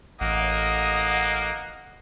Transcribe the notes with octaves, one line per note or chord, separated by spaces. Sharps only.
A1 A#3 D#5 F#5